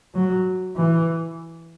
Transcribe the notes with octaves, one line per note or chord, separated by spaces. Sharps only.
F#3
E3